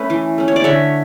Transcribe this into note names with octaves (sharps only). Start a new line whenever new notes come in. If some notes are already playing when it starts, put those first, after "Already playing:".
Already playing: A3 C#4 B4
E3
A3 C#4
C#5
D5
D3 C#5 E5